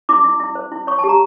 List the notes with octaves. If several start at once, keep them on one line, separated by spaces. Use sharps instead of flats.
E4 D6
E4
E4
C5
E4
C#5 C#6
A5
G4
A#5